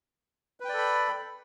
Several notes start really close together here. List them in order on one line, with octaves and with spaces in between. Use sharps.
B4 G5 D5 A4 B5